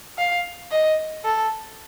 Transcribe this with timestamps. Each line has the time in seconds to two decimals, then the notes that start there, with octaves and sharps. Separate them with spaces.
0.18 F5
0.71 D#5
1.25 A4